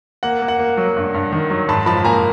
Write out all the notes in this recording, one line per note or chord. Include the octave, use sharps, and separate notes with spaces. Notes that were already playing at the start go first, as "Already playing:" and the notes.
A#3 F#5
A#3
F#5
A#3
F#3
G2
G2
D#3
F#3
G#2 A5 B5
F3 A5 B5
A#3 G#5 A#5